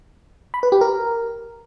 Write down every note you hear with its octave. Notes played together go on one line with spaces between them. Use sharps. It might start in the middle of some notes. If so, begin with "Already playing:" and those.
B5
B4
G4
A#4